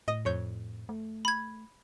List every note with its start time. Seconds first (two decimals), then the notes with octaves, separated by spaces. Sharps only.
0.08 A2 D#5 D#6
0.25 F2 C#5 G6
0.89 A3
1.25 B5 G#6